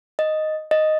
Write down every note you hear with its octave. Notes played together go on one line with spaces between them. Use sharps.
D#5
D#5